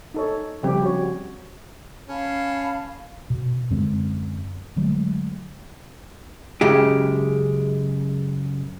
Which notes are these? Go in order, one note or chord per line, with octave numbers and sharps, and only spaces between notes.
D#4 A4 C#5
C#3 F3 G3 C4 G4
F#4 C#5
C#4 F5 A5 B5
B2
F#2 D3 G#3 C4
D3 F#3 G#3 A3
F#2 C#3 G#3 G4